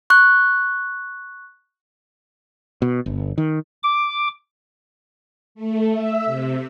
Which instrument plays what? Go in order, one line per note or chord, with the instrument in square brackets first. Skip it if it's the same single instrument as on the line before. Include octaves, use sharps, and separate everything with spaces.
[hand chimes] C#6 F#6
[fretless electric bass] B2
G1
D#3
[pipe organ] D6
[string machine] A3
E5
C3